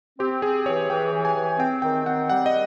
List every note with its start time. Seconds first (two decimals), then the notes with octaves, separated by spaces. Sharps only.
0.19 C4 G4
0.42 C4 G#4
0.66 E3 C#5
0.90 E3 G5
1.12 E3
1.25 G#5
1.36 E3
1.59 C4 G5
1.82 D#3 G5
2.05 C4 F#5
2.30 G3 F#5
2.46 D#5